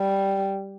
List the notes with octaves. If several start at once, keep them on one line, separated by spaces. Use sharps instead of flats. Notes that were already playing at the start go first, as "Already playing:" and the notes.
Already playing: G3